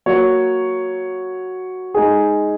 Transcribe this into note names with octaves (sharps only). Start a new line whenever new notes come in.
F#3 A#3 F#4 C#5
G#3 D#4 G#4